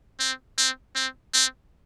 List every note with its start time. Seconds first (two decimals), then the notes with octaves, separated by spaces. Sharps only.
0.20 C4
0.58 C4
0.95 C4
1.33 C4